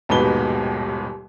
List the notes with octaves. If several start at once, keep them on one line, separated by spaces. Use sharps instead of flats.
D#1 D#2 G#2 B2 B4 G7